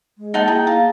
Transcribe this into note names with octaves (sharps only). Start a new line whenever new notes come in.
G#3
A#3 D#4 F#5 A5
E4 G#4 G5 A#5
F5 A5